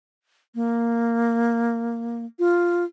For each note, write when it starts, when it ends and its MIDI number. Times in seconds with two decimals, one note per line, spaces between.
0.55 2.25 58
2.39 2.84 65